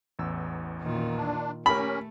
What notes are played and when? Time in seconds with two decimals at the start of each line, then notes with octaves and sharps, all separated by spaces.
0.19 A1 E2 E6
0.82 F#2 A#2 D#3 F4
1.16 D4
1.66 A3 C#4 G4 A#4 B5